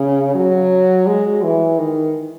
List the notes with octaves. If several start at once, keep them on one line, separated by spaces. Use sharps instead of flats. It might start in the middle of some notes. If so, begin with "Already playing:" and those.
Already playing: C#3
F#3
G#3
E3
D#3